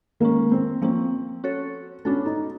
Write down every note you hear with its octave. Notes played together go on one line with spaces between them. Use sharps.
D#3 G#3 A#3 C#4
C4
F3 A#3 C4 C#4
C#4 F#4 A4 C#5
B3 C#4 D4 F#4 A4
D#4